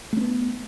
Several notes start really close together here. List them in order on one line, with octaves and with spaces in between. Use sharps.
A3 C#4 B3